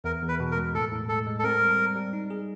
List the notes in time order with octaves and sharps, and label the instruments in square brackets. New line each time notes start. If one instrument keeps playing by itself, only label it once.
[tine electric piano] E2 [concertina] A#4
[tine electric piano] E2
[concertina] B4
[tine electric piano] B2
[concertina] A#4
[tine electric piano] G#3
[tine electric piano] A2 [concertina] A4
[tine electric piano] A2
[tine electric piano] G#3 [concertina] A4
[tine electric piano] G#3
[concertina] A4
[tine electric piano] C4 [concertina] A#4
[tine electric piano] G3
G3
G3
D#4
G#4